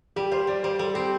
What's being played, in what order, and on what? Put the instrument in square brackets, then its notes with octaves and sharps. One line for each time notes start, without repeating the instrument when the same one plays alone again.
[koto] G3 [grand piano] G4
[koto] F4 [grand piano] C5
[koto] G3 [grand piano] D5
[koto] G3 [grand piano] C5
[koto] G3 [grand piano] A4
[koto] C4 [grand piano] G4